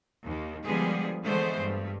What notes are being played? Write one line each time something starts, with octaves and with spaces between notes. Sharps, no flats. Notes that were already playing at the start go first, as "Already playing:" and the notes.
D#2
D3 F3 G3 G#3 B3 G#4
D3 E3 G#3 A3 B3 C5
G2